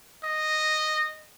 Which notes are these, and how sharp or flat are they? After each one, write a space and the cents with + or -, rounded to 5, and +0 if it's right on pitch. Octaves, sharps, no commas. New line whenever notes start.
D#5 -10